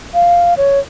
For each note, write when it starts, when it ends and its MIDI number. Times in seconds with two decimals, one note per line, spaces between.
0.14 0.54 77
0.57 0.79 73